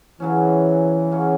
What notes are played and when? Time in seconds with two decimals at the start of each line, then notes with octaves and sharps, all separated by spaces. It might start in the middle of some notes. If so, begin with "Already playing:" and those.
0.20 C#3 E3 F#3 C#4
1.12 C#3 F#3 C#4